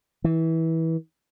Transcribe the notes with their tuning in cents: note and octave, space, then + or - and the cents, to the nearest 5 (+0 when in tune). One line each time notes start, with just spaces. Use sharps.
E3 -20